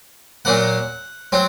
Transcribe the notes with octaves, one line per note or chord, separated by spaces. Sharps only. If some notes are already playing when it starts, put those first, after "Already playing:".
A#2 F#3 A#3 F#5
F#3 C4